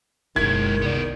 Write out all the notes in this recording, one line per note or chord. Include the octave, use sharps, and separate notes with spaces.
F#1 B2 D#3 G#3 E4 G#6
C2 B3 D5